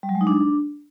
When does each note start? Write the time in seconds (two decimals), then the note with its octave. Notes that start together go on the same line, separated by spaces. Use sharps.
0.03 G3
0.09 F#3
0.15 G#3
0.21 D#4
0.27 D4